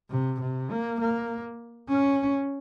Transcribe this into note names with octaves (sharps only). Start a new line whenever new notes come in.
C3
C3
A#3
A#3
C#4